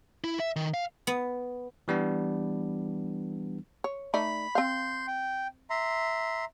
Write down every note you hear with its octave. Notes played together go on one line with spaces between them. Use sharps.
E4
E5
D#3
F5
B3
E3 G3 B3 D4
C#5
A3 D#4 D5 B5
C4 F5 C6 G6
G5
E5 A#5 C6